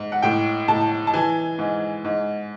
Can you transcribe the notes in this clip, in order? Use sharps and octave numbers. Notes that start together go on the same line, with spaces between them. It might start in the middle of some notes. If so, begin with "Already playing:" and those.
Already playing: G#2
F#5
A2 G5
A2 A5
A5
E3 G#5
G#2
G#2